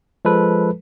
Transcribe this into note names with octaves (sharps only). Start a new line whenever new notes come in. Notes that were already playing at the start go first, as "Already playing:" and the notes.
F3 G#3 A4 B4